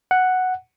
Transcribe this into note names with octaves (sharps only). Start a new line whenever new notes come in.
F#5